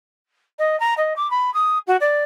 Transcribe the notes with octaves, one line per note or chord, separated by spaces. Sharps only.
D#5
A#5
D#5
D6
B5
D#6
F#4
D5